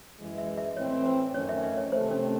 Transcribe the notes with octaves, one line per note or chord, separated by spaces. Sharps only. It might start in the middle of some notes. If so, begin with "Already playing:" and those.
F#2 E3 G#3
E5
E5
A2 E3 C4 C#5
C5
F#2 D#3 A3 C#4 C#5
E5
E5
C#5
C3 D#3 A3 C5
C#4